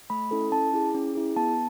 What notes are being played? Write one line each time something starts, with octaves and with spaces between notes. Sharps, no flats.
A3 B5
C#4 E4 A4
C#4 A5
E4 G#4
C#4
E4 G#4
B3 A5